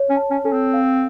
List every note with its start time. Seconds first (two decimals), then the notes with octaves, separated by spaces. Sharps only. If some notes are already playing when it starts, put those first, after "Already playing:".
Already playing: C#5
0.10 C#4
0.16 A5
0.31 C#4
0.45 C#4 A4
0.53 C4
0.74 F5